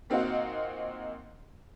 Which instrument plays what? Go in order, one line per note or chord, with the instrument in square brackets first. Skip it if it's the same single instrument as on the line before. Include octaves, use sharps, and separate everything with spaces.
[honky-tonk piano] A#2 C4 D#4 F#4 F5 F#5